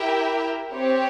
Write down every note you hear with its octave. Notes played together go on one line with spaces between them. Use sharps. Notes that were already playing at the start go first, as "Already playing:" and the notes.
Already playing: E4 G4 A#4 E5 G5
C4 G4 C#5